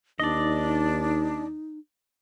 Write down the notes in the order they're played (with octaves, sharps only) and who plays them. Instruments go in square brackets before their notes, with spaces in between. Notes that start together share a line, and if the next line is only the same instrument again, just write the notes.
[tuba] D#2 [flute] D4 [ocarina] D#4 [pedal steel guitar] D5 D#5